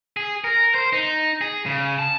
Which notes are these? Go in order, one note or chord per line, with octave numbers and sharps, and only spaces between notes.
G#4
A#4
C5
D#4
G#4
C#3
A5